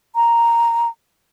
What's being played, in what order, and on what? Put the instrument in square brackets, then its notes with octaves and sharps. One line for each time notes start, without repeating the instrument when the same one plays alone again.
[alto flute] A#5